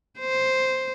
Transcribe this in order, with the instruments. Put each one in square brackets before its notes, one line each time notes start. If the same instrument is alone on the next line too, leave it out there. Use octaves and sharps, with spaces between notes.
[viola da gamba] C5